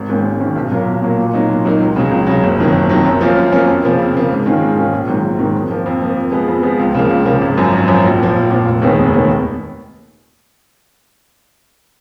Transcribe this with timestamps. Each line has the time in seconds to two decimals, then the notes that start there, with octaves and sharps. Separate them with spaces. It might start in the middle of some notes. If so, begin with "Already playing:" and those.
Already playing: G#1
0.09 G#2 D#3 A#3 C#4
0.25 G#1
0.40 G#2 D#3 A#3 C#4
0.56 B1
0.71 A#2 F#3 A#3
0.87 B1
1.02 A#2 F#3 A#3
1.18 A#2
1.34 F#3 A#3 D#4
1.49 A#2
1.65 F#3 A#3 D#4
1.80 C#2
1.96 C#3 F#3
2.11 C#2
2.27 C#3 F#3
2.43 F#1
2.58 F2 D#3 F#3
2.73 F#1
2.89 F2 D#3 F#3
3.05 F#2
3.21 F3 A#3 C#4 F4
3.36 F#2
3.51 F3 A#3 C#4 F4
3.68 F2
3.83 C#3 F3 A#3
3.99 F2
4.15 C#3 F3 A#3
4.30 G#2
4.46 D#3 G#3 C#4 F4
4.61 G#2
4.76 D#3 G#3 C#4 F4
4.93 A#1
5.07 G#2 D#3 F#3
5.23 A#1
5.39 G#2 D#3 F#3
5.55 F2
5.70 F3 A#3
5.86 F2
6.02 F3 A#3
6.17 F2
6.32 F3 G#3 B3
6.48 F2
6.63 F3 G#3 B3
6.79 C#2
6.94 C#3 F3 A#3
7.10 C#2
7.25 C#3 F3 A#3
7.41 G#1
7.58 F#2 F3
7.73 G#1
7.88 F#2 F3
8.04 A#1
8.19 A#2 F3
8.36 A#1
8.50 A#2 F3
8.66 F1
8.82 D#2 D#3 G#3 B3
8.98 F1
9.13 D#2 D#3 G#3 B3